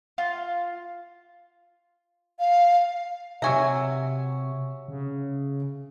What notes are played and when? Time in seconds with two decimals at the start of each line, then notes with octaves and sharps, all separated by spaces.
0.18 F4
2.39 F5
3.42 C3 F#3 E5 G#5 A#5 C#6 E6
4.88 C#3